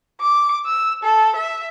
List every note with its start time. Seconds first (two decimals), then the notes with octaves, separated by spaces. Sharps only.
0.21 D6
0.66 E6
1.03 A4
1.36 E5